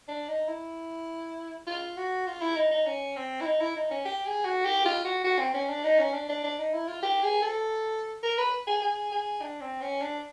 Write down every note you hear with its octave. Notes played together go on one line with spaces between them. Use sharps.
D4
D#4
E4
F4
F#4
F4
E4
D#4
D#4
C#4
C4
E4
D#4
E4
D#4
C#4
G4
G#4
F#4
G4
F4
F#4
F#4
C4
C#4
D4
D#4
C#4
D4
D4
D4
D#4
E4
F4
G4
G#4
A4
A#4
B4
G#4
G#4
G#4
D4
C4
C#4
D4